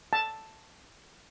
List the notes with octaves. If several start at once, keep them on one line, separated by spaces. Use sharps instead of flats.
A5